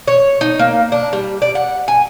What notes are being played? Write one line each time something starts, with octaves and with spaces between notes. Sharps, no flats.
C#5
D#4
A#3
D4
G3
D5
F#5
G#5